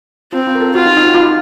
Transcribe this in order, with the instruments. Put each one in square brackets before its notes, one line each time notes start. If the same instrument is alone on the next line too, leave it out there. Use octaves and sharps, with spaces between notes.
[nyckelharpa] C4 [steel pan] F4
[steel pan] F4
A#4
A4
[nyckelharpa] F4 [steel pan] F#4
[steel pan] D#4
D#4
F#4
F4
D#4